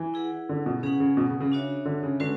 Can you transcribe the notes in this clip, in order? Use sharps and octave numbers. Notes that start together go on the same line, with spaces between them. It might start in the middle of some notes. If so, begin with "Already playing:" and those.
Already playing: E3
E4 G#4 B4 F#5
D3
B2
C#3 C#4 G#4 B4 F#5
C#3
B2
C#3
C#3
D4 F#4 C#5 E5
D3
C#3
D3 G#3 C#4 F#4 B4